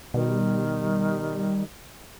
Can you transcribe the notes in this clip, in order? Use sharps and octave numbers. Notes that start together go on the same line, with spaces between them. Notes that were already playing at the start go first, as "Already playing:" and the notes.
B2 D#3 G3